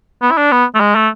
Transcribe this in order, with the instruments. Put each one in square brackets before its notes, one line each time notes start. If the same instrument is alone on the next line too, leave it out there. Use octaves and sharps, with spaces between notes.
[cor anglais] B3
E4
D4
B3
A3
G#3
A3